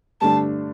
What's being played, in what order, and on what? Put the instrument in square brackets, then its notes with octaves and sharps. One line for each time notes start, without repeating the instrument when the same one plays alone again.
[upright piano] G2 D3 A3 D4 [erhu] A5